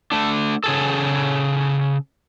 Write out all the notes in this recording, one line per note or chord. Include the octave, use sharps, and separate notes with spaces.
A3 D4
C#3 G#4 A4